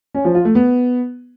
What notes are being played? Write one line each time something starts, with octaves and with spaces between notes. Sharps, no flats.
C#4
F3
F4
A3
B3